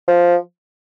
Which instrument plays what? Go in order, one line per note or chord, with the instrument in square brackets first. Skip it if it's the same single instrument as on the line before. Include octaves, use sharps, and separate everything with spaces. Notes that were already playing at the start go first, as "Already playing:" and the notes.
[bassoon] F3